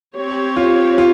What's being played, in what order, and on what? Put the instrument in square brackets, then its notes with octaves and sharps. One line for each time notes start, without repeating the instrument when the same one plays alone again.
[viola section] C4 G4 C#5
[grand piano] F4
F4